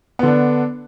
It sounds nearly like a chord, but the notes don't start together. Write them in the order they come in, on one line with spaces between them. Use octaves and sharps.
B3 D3 D4